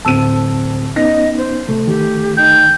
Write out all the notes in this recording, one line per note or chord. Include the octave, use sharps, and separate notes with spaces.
D1 C4 A5 E6 D#7
B3 C#4 D#4 D#5 A#6
C5
C3 A3
D#3 G4
D#4 G5